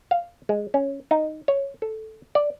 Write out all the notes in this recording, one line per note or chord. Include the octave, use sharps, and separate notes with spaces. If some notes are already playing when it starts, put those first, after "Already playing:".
F5
G#3
C#4
D#4
C#5
A4
D5